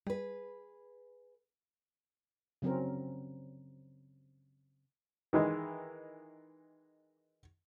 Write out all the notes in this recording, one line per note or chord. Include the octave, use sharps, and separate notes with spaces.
G3 G#4 B4
C#3 F#3 C4 C#4 A#4
D#3 E3 G#3